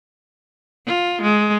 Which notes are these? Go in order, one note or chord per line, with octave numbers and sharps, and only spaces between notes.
F4
G#3